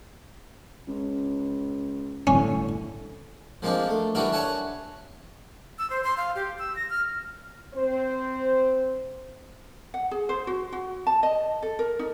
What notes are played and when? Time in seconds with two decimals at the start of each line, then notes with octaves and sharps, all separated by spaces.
0.87 C#2
2.27 G1 A2 D3 C#4
3.62 F3 G#3 A#3 C4 D4
3.89 A3
4.15 E3 G3 D4 F#4 A#4 E5
4.32 C#5 E5 F#5 G#5 A5
5.79 E6
5.90 C5
6.04 C6
6.17 F5
6.35 G4
6.59 E6
6.76 A#6
6.90 F6
7.75 C4 C5
9.94 F#5
10.11 G#4
10.29 C5
10.47 F#4
10.73 F#4
11.07 A5
11.23 D#5
11.63 A4
11.79 A#4
11.99 D#4